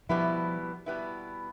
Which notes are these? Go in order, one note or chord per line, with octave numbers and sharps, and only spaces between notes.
B2 F3 G3 B3 E4
B2 G3 B3 E4